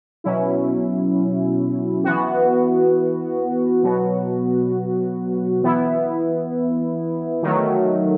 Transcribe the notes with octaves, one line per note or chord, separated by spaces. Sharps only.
B2 F#3 C#4 E4
E3 B3 F#4
B2 F#3 B3 F#4
E3 B3 E4
D#3 F#3 A3